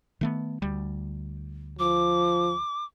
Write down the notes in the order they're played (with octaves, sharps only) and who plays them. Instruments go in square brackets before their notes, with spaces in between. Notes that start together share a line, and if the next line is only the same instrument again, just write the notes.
[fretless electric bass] D#3 A3 B3
D2 G3
[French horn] F3 [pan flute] D6